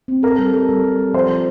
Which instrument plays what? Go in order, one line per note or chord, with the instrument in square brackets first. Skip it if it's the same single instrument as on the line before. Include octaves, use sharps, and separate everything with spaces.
[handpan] C4
[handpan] A4 [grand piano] A#4
[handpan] G3
A4
G3
G3
G3
[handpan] F3 [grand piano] C5
[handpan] F3